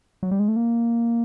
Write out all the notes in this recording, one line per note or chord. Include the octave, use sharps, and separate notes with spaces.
F#3
G3
G#3
A3
A#3